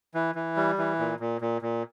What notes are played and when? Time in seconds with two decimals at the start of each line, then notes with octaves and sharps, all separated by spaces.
0.14 E3
0.35 E3
0.57 G3
0.78 E3
0.99 A#2
1.20 A#2
1.41 A#2
1.62 A#2